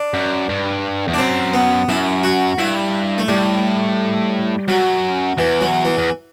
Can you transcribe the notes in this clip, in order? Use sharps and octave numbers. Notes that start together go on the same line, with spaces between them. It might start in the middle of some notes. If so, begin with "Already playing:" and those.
Already playing: D4
F#2
G2
E2
D4
F#2 C4
B3
F#2 E4
F#4
G2 E4
A3
A2 G3
F#2 F#3
E2 E3
F#3
E3
E2